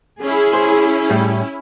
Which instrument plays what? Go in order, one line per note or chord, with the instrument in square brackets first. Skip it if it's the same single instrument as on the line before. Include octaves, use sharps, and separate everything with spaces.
[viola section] C#4 E4 [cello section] G#4
[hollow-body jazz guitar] C5
A2 G3